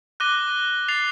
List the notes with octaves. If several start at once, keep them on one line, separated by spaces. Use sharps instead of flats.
D6 F#6 A#6 D#7 G7
A6 C7 F7